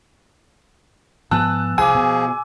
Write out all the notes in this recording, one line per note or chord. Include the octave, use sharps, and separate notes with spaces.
G#2 F3 B3 G#5 A5 E6 F#6
C2 F3 G#4 G#5 D6 E6
B2